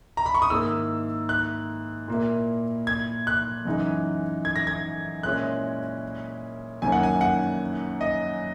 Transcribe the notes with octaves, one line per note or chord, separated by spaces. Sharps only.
A#5
B5
C#6
D#6
G#2 D#3 A#3 E4 E6
F#6
A#2 A#3 E4
G#6
F#6
F#2 E3 G#3 D#4
G#6
A#6
G#6
A#2 G#3 C#4 E4 F#6
F#2 D#3 A#3 C#4 E4 G#5
F#5
G#5
F#5
D#5